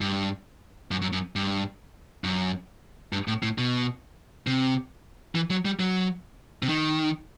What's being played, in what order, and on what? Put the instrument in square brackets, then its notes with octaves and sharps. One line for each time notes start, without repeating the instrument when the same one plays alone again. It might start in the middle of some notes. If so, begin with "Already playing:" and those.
[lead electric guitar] G2
F#2
F#2
F#2
G2
F#2
G2
A2
A2
B2
C3
E3
F#3
G3
F#3
C3
D#3